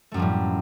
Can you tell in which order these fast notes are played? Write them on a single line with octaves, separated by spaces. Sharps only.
A3 F#2 F3 G3 A2